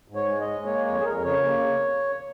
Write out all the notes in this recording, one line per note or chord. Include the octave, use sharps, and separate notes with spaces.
G#2
C#5
G#3
D#5
G#3
A#3 C#5
F2 C#5
G#4
F2 A#4
C#3 C#5
A#3